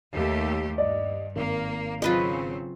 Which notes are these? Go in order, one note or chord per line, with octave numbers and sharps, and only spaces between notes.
D#2 A3 G4
G2 D5 D#5
G#1 A#3
C#3 F#3 C4 F4 B4 D#5